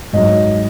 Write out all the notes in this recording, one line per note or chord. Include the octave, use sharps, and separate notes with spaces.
G#2 F#3 D#5